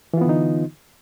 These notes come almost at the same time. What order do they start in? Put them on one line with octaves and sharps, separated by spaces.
E3 F4 B3 D3 D#4